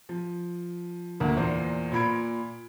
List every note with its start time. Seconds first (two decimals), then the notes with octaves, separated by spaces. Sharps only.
0.09 F3
1.20 D2 A#3
1.37 E2 A#2 C5
1.92 A#2 F4 B5 G#6 D7